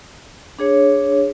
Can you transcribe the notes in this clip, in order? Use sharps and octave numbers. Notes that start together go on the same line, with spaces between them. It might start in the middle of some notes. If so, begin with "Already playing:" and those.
D4 G#4 C#5